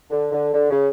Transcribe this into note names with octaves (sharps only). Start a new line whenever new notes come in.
D3
D3
D3
C#3